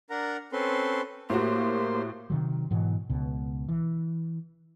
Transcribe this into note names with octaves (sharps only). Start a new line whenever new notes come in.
D4 A#4 F#5 A#5
C4 C#4 A4 B4 C6
A2 A#3 F#4 G4 C5
C3 D#3 F#3
G#2 B2 E3 F#3
C#2 B2
E3